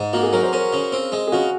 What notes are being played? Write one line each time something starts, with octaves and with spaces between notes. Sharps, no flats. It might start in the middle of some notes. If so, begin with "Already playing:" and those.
Already playing: G#2
A#3 F#4
G#4
F#3 A#4
C5
C#4 A#4
C#3
C4
G#3
G#4
C#3 F#4